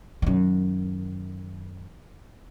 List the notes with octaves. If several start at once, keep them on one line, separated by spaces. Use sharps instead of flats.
F#2 D#3